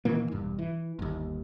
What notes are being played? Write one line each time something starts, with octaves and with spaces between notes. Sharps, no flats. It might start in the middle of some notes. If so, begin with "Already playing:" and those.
A#2 D#3 E3 A#3
E1 G2
E3
G1 D#2